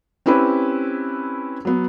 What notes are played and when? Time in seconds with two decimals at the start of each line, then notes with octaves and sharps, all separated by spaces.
0.26 C4 C#4 E4 G4 B4
1.65 F#3 B3